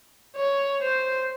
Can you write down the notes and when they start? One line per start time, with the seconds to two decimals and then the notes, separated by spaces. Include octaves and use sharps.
0.36 C#5
0.82 C5